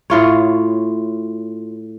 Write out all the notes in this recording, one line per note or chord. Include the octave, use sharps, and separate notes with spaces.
A2 F4 C#5